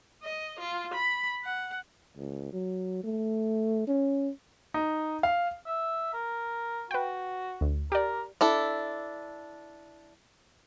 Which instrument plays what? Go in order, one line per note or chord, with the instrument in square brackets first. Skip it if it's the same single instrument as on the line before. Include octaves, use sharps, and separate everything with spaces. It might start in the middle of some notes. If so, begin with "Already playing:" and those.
[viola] D#5
F4
B5
F#5
[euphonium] C#2
F#3
A3
C#4
[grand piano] D#4
F5
[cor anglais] E5
A#4
[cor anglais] F#4 [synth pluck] B4 G5
[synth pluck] D2
[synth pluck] G4 D5 [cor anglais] A#4
[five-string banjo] D4 E4 A4